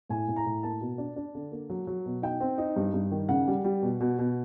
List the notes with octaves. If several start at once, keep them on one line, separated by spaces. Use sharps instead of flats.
A2 G#5
A2
A#5
A2
A#3 A5
B2
D4
D4
D3
A#3
F#3
F#3
B2
D#4 G5
C4
D#4
G2
G2
D#3
C#3 F#5
G3
G3
B2
B2
B2